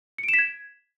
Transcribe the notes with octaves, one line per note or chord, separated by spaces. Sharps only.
C#7
D7
E7
B6
G#6